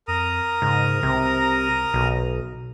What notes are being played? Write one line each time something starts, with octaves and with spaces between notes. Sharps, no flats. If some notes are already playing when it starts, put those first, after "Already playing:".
F2 A#4 A#5 D#6
G#2 C#3
C2 C3
B1 B2